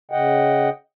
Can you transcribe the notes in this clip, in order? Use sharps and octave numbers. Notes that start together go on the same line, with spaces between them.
C#3 D#5 F#5 G5